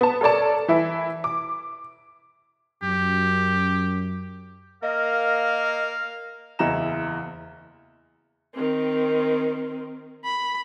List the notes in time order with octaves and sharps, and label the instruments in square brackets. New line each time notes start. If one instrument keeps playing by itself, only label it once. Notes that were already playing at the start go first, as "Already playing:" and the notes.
[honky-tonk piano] B3 A5
A4 A#4 C#5 D5 A5
E3 E4
D6
[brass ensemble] F#2 [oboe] G4
[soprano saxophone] A#3 [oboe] A#4 [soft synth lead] D#5 [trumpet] F5
[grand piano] F#1 E2 E4 D#5 A#5 E7
[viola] D#3 C4
B5